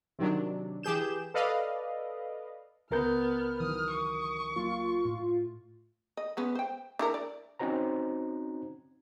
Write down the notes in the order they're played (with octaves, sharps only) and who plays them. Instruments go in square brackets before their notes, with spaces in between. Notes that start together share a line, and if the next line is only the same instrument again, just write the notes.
[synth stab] C3 D#3 F#3 D4
E3 G4 G#4 G6 E7
A4 B4 D5 D#5 F5
[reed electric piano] C#2 A#4 G6 [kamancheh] B3 F6
[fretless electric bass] D#3 E3 F#3 [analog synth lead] D#6 [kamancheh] F6
[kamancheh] C#6
[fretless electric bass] F#3 A#3 [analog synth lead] F4
[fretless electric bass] A2
[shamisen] D#5
G#3 B3 C#4
C5 G5
D4 E4 A#4
D5
[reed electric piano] C4 C#4 D#4 F#4 C5 A#5